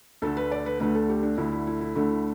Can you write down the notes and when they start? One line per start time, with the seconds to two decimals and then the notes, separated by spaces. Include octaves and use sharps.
0.22 D2 D3 A3 A4
0.37 B4
0.52 D5
0.66 B4
0.80 D2 D3 A3 B4
0.95 A4
1.09 G4
1.23 D4
1.37 D2 D3 A3 E4
1.52 E4
1.67 E4
1.81 E4
1.95 D2 D3 A3 E4